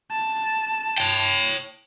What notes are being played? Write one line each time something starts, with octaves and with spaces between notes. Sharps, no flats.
A5
C#5 G5